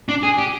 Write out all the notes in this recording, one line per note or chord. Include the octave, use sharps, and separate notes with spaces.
D4
G#4
G4